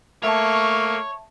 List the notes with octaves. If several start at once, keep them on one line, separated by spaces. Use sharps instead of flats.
A3 A#3 C#5 E5 A5